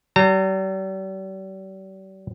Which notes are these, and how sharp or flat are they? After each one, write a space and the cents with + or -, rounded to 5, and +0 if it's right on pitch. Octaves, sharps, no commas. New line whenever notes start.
G3 -40 A#5 -35